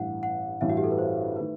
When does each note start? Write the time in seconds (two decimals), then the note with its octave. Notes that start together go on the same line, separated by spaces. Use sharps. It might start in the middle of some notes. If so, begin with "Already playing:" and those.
Already playing: A1 G2 E3 F#5
0.23 F#5
0.61 A1 G2 E3 E5
0.69 F#4
0.77 G4
0.84 A4
0.91 B4
0.98 C5
1.36 D#3 A3 B4